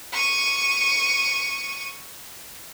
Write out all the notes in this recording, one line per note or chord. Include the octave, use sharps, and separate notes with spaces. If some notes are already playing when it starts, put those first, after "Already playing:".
C#6 D#7